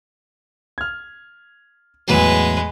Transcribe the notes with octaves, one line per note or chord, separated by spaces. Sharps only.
F6 G#6
E2 A2 F#3 G#3 B4